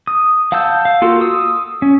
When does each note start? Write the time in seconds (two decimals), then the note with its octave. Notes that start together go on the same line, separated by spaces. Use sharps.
0.07 D#6
0.52 F5 F#5 A5 E6 G6
0.85 F5
1.02 A#3 F4 F#4 A4
1.21 D#6 E6
1.82 C#4